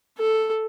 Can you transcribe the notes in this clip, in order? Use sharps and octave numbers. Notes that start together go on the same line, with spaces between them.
A4